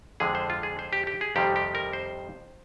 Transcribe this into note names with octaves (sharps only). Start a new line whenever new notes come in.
F2 D3 F3 G#3 G#4
C5
F4
G#4
C5
G4
G4
G#4
F2 C3 D#3 G3 G4
G4
A#4
C5